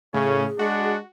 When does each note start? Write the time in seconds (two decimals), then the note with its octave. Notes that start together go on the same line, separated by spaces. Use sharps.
0.14 A2 C#3 C#4 G#4
0.59 G#3 D4 F#4